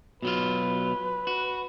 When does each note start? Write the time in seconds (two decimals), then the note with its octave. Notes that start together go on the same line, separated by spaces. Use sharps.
0.22 B2 F#3 F4 B4
1.27 F#4